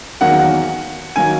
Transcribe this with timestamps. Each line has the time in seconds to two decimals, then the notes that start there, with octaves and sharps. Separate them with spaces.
0.21 E2 D#3 F#3 A#3 F#5
1.16 D#3 F#3 A#3 G#5